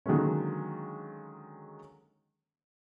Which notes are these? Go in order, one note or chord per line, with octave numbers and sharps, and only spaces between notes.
D3 D#3 F#3 G#3 A#3 C#4